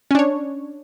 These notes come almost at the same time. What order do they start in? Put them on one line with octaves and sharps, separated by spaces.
C#4 D4 C#5